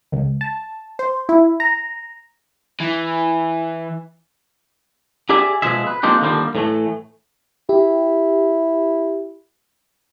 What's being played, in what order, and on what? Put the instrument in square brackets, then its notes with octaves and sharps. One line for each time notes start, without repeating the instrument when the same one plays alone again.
[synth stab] C#2
A5
C5
E4
A#5
[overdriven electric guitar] E3
[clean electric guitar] G4 G#4 D5 E5 G#5
B2 F3 G#3 G#4 E5
B4
F3 A#3 C4 D4 D#4 G4
D3 D#3 F3 G3 G#3 A#3
A2 E3 A3
[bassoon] E4 [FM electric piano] G4